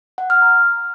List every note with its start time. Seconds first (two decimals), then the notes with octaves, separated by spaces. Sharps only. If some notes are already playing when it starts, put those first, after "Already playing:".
0.18 F#5
0.30 F6
0.42 A#5